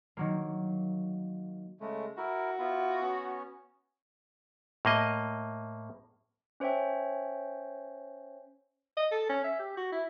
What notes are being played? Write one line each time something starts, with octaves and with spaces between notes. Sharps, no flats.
D#3 F#3 A#3
C#3 G#3 A3
E4 F#4 A#4
B3 E4 F4
B3 C#4
A2 A#3 D#5
C#4 C5 C#5 E5 G5
D#5
A4
C#4
E5
G4
F#4
E4